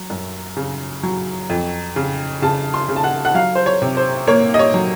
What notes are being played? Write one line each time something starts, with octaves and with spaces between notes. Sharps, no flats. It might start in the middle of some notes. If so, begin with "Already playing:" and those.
Already playing: F#3
F#2
C#3
F#3
F2
C#3
C#3 A5
C6
C#3
A5
F#5
F#5
F#3 F5
C5
C#5
C3
C5
A#3 C#5
D#5
C#5
F#3